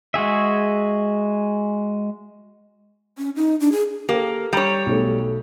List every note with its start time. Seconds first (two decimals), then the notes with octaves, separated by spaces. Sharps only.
0.14 G#3 F#4 G#4 E5
3.18 C#4
3.36 D#4
3.60 D4
3.72 G#4
4.09 A#3 G4 A4
4.53 G3 C#5 A#5
4.86 B1 A3